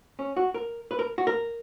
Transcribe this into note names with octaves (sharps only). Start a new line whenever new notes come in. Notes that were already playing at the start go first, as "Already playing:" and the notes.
C#4
F#4
A#4
B4
A#4
F#4
A#4